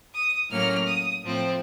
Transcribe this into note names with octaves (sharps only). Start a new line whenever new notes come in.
D#6
A2 F#3 A#3 C#4 F6
D#6
A2 F3 C4